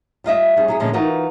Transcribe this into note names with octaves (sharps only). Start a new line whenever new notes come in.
G3 F4 D#5 E5
G3 C#4 G#4
F#3 E4 G#4
A#2 D3 F3 G#3 C#4
E3 D#4 F4 F#4 A#4 B4